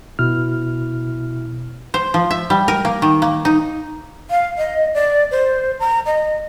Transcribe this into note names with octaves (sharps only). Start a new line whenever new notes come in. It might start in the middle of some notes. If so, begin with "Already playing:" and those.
B2 E4 F6
C5
F3
E5
G3
A#4
A#3
D#3
A#3
D#4
F5
D#5
D5
C5
A#5
D#5